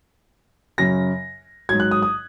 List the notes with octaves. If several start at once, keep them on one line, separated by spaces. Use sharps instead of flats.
F#2 C#3 F#3 A#6
G#2 F#3 G#6
F#6
D#6
D#6